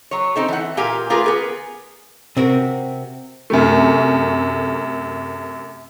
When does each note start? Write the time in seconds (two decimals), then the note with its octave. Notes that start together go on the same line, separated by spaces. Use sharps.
0.11 F#3 C#5
0.36 C4 D#4 A4
0.48 E3 F#5
0.77 A#2 G4 A#4 F5 G#5
1.10 A3 F4 G4 G#4 A#4 B4
1.24 B3 G#4 A#4
2.37 C3 C4 F#4 A#4
3.50 F#2 C3 A3